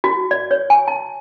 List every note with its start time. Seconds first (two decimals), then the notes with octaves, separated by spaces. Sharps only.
0.04 F#4
0.31 D5
0.51 C#5
0.70 G#5
0.88 A5